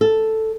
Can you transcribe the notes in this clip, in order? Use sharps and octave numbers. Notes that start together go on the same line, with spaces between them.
A4